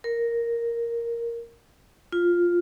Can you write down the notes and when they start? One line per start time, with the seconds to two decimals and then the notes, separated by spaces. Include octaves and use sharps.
0.04 A#4
2.12 F4